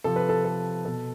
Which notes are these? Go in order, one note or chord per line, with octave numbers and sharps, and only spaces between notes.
C3 F3 A4
B4
A4
A4
B2 A4